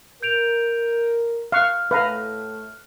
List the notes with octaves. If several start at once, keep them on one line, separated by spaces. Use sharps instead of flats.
A#4 G6 D7 F7
F5 C#6 F6 F#6
A2 A3 B4 F5 A#5